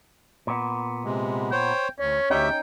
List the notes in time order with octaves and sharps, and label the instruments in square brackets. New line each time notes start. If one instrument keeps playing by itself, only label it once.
[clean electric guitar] A#2 B3
[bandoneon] C3 G#3
[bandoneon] C5 C#5 [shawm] G5
[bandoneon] D2 [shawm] C#4 [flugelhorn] C#5
[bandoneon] D2 G4 E5 [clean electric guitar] C#4 D#4 [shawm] G5